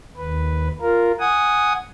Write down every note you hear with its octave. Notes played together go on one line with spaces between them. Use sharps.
D#2 B4
F4 A#4
F#5 G#5 D#6